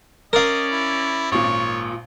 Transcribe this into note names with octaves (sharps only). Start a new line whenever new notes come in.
C#4 A#4 D5 D#5 F5
E4
G#1 A#2 C#5